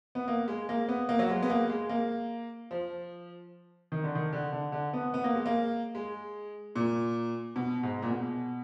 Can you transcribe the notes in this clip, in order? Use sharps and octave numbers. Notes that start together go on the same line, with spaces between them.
B3
A#3
G#3
A#3
B3
A#3
F#3
G#3
B3
A#3
G#3
A#3
F3
D#3
D3
D#3
D3
D3
D3
B3
B3
A#3
G#3
A#3
G#3
A#2
B2
G#2
A#2
B2